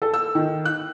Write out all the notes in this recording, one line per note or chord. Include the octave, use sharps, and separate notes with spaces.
A4
E6
D#3
F#6